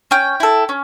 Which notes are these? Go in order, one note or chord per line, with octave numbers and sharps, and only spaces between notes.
C#4 G5
E4 A4
C#4